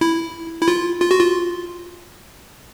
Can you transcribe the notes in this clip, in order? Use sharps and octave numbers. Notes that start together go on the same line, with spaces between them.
E4
E4
F4
F4
F#4
F4